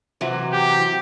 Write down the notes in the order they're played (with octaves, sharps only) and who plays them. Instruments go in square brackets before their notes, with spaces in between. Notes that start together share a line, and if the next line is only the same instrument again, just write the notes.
[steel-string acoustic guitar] C3 E3 F#3
[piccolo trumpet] G4